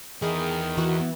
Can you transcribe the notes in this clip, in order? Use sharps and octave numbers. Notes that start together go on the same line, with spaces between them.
E2 D#3 E4 G#4
E3 F#4